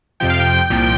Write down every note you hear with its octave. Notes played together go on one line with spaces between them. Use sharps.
F2 C3 F3 G5
F5
G5
C2 A#2 F3